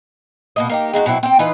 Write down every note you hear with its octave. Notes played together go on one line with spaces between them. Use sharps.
B2 A#3 D#5
A#3 D#4 G4
G#3 D#4 F4 F#4
B2 F#3 C4 E4
C4 G5
E3 D#4 F4 B4